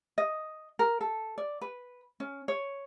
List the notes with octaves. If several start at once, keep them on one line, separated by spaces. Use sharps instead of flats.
D#5
A#4
A4
D5
B4
C#4
C#5